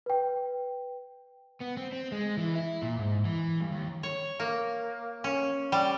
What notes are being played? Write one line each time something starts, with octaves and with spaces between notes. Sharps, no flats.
B4 G5
B3
C4
C4
G#3
E3
E4
A#2
G#2
E3
G2
D#2
C#5
A#3
C#4
G3